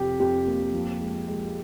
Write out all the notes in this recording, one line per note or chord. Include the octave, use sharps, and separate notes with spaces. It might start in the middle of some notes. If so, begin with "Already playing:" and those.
Already playing: F2 C3 G4
F2 G4
A#3
F3
G#3
G#3